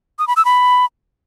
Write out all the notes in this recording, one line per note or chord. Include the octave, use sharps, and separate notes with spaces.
D#6
B5
E6
B5